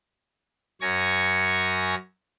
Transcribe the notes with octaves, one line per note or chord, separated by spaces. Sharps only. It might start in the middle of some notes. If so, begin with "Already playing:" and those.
F#2 C#5 G#5 C#6 A#6